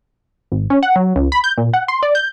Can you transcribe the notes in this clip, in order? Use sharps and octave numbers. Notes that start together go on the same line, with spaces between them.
G#1
C#4
F#5
F#3
C#2
B5
G6
A#2
F#5
C6
D5
G6